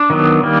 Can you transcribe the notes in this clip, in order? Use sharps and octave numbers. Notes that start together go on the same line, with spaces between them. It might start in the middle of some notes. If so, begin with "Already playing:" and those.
Already playing: D4
D#3 F#3 B3
D#3 G3 A#3